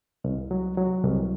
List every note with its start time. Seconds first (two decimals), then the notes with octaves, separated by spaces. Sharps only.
0.24 C2
0.51 F#3
0.77 F#3
1.03 C2